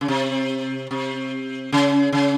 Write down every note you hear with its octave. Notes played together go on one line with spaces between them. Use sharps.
C#3
C3
C3
C#3
C#3